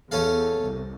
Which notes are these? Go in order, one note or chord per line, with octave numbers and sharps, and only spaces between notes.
E2 C#4 A4 F5
C2